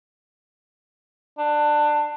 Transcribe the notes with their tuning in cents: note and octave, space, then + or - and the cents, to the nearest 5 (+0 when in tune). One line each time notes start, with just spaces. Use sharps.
D4 +20